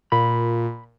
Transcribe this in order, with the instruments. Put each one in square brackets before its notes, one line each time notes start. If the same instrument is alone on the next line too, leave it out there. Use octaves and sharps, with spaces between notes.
[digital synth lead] A#2 [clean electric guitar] B5